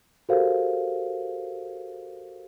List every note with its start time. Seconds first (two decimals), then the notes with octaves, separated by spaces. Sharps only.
0.29 F#4 G4 A4 A#4 C5 F5